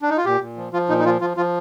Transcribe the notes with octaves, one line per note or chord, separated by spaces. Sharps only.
D4
D#4
F4
A#2 G4
A#2
F3
F3 F4
A#2 D#4
D#4
F3 F4
F3 F4
F3 F4